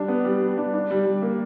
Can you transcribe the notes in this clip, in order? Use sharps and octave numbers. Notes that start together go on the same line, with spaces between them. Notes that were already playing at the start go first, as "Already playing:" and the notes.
Already playing: G3 D4
B3
G3
G3
D4
D4
G3
G3
A#3